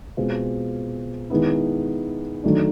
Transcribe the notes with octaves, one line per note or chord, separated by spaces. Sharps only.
B2 G#3 C4 F4
D#3 G#3 B3 E4
D#3 F#3 A3 D4